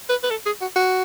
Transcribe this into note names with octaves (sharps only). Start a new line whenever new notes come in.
B4
B4
A4
G#4
F#4
F#4